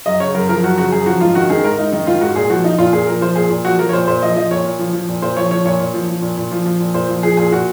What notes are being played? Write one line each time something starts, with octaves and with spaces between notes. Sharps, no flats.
F#2 D#5
C#3 C#5
F#2 A#4
F3 A#4
F#2 F#4
C#3 F#4
F#2 G#4
F3 F#4
G#2 F4
D#3 F#4
D#3 G#4
G#2 A#4
G#2 D#4
D#3 D#4
D#3 F4
G#2 F#4
A#2 G#4
F3 F#4
F3 D#4
A#2 F4
A#2 G#4
F3 A#4
F3 C5
A#2 G#4
A#2
F3 F#4
F3 A#4
C#5
A#2 C5
A#2 C5
F3 D#5
F3 D#5
A#2 C#5
A#2
F3
F3
A#2
A#2 C5
F3 C#5
F3 C#5
A#2 C#5
A#2
F3
F3
A#2
A#2
F3
F3
A#2
A#2 C5
F3
F3 G#4
A#2 G#4
A#2 F#4